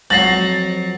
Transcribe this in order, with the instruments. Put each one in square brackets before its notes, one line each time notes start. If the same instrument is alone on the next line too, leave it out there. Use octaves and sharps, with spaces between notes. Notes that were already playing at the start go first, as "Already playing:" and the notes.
[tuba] F2 [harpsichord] F#3 F#4 F#5 [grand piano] A6 A#6 C7 [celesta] F#7